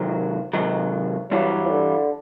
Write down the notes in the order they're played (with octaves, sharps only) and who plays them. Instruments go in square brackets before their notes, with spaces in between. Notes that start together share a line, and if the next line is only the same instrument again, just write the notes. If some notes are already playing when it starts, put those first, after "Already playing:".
Already playing: [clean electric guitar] C3 D#3 F#3
C3 D#3 F#3
[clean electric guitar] G2 E3 G3 [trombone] F#3
[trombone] D3